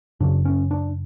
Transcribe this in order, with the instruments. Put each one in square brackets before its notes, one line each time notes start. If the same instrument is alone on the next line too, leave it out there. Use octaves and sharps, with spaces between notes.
[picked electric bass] F#2 C#3 D4
C#4
D4